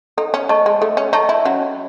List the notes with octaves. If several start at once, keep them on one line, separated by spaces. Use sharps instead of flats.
D#4 A4
C#4
A3 D#5 A5 C#6
G#3
A3 A4
C#4
D#4 D#5 A5 C#6
E4
F#3 C#4